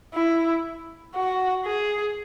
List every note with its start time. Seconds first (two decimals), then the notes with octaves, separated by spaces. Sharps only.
0.14 E4
1.15 F#4
1.65 G#4